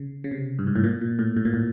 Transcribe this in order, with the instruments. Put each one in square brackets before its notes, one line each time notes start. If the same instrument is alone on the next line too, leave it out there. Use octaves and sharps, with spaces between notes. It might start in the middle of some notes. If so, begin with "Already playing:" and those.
Already playing: [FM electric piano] C#3
C#3
C3
G2
G#2
A2
A#2
A#2
A2
A2
A#2
A2